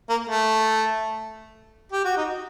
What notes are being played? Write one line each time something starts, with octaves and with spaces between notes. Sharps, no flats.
A#3
A3
G4
F#4
D#4